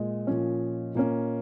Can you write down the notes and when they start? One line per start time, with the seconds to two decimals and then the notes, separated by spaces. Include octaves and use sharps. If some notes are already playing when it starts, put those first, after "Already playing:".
Already playing: A#2 G#3 D#5
0.27 A#2 F3 C#4
0.95 A#2 A#3 C#4